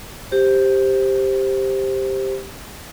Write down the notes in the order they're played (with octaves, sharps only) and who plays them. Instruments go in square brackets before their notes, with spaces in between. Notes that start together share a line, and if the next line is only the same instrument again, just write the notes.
[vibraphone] G4 C5